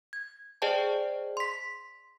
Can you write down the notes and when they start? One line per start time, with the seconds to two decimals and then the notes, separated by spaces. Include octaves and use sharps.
0.13 G#6
0.62 G#4 C5 D5 D#5 G5 A5
1.37 C6 B6